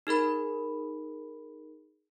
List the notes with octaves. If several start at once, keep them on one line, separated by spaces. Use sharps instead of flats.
D#4 G#4 A#4 B5